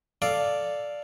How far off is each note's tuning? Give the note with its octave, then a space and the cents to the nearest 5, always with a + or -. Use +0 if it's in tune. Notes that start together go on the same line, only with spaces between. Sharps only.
A4 +0 D5 +0 F5 +0